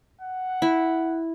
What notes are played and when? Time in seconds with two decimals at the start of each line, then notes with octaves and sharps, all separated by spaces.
0.21 F#5
0.62 E4